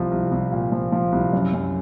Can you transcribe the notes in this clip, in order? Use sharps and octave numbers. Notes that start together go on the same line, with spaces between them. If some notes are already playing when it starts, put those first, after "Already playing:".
Already playing: C2 F3
C2
C2
A#2
F3
F3
C2
F#2
F#2